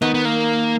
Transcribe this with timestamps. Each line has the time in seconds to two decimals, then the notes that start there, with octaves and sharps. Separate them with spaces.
0.02 D#3 B3
0.14 B3
0.25 A#3